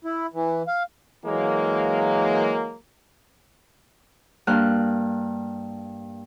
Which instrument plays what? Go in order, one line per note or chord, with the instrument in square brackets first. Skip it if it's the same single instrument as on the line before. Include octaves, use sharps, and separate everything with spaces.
[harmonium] E4
E3
F5
[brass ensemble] E3 F#3 G#3 A#3
[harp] G2 A#3 F6 F#6